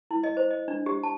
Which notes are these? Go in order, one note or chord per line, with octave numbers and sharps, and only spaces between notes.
E4
D#5
C5
D#5
D4
G4
A5